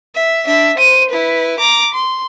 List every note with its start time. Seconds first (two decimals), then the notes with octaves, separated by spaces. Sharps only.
0.15 E5
0.46 D4 E5
0.77 C5 D#7
1.10 E4 B4
1.60 A#5 D6
1.94 C6